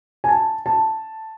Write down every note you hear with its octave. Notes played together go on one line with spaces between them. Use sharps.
G#5
A5
A5